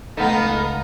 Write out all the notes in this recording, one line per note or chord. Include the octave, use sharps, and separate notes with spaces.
C#2 A3 B3 D#4 F5 A#5